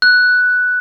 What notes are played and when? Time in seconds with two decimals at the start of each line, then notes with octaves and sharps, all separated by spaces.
0.02 F#6